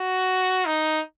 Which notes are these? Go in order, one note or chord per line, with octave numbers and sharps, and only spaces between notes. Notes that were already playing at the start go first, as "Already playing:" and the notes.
Already playing: F#4
D#4